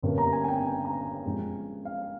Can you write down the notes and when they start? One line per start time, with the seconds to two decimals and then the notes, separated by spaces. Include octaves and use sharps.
0.02 G1 G2 G3 A#3 C#4
0.18 A#5
0.33 G#5
0.44 G#5
0.48 G5
0.85 A#5
1.05 G#5
1.25 G2 F3 G#3 C#4
1.85 F5